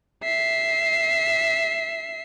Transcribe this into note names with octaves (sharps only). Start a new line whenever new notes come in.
E5 C7